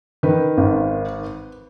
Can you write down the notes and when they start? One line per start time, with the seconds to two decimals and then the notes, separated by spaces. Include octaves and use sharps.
0.23 D#3 B4
0.57 G#1